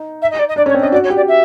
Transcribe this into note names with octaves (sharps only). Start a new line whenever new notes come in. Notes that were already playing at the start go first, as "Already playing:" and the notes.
Already playing: D#4
E5
D#5
D5
D#5
D4 D5
C#4 C#5
C4
D4 D#5
F#4 D5
C#5
G4
D5
E5